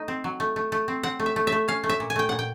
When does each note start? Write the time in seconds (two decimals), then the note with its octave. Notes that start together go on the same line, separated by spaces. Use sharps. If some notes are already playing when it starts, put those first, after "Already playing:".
Already playing: A3 D#4
0.08 C4
0.24 F#3
0.40 A3
0.56 A3
0.72 A3
0.88 C4
1.03 C4 F#5
1.20 A3
1.26 E5
1.36 A3
1.47 E5
1.52 A3
1.68 C#4 F5
1.84 A3
1.89 E5
2.00 A#2
2.10 G#5
2.16 A3 G5
2.29 A#2 F#5
2.39 G5